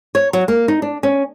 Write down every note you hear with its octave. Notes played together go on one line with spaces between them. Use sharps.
C#5
F#3
A#3
D#4
D4
C#4